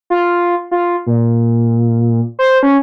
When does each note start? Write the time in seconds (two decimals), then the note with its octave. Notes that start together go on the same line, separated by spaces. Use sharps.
0.10 F4
0.71 F4
1.07 A#2
2.39 C5
2.63 C#4